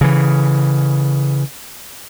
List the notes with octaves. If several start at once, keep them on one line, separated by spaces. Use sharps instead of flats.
C#3 E3